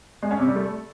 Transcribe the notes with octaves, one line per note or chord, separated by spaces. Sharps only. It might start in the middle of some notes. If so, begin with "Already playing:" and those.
G#3
C#4
C3
G3
A3